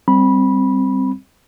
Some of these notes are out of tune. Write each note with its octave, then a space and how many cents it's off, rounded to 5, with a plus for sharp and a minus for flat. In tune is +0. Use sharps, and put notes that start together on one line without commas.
G3 +0 C4 +0 B5 -15